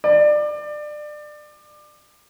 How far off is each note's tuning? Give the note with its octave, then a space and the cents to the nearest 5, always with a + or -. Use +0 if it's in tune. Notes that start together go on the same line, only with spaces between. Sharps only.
D5 +25